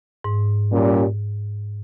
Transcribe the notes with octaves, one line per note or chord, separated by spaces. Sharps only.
G#2
A#2 G3 C#4 G4